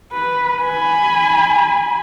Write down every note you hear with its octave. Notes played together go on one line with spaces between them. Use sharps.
B4
G#5 B5